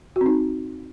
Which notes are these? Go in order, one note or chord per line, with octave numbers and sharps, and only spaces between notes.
F#4
C4
D#4